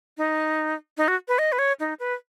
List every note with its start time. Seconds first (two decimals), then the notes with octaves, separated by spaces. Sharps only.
0.18 D#4
0.97 D#4
1.08 F#4
1.28 B4
1.39 D#5
1.52 B4
1.59 C#5
1.80 D#4
2.00 B4